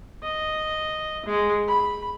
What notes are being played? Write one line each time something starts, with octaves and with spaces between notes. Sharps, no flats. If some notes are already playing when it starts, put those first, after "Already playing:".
D#5
G#3
B5